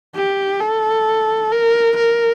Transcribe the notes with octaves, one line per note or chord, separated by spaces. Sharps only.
G4
A4
A#4
A#4